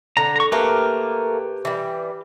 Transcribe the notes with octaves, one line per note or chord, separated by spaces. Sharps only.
D3 A#5
A#5 C#6
A3 A#3 G4 A#4 B4
E3 G3